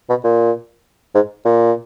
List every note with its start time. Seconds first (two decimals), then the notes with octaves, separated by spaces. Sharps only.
0.09 B2
0.24 A#2
1.15 G#2
1.45 A#2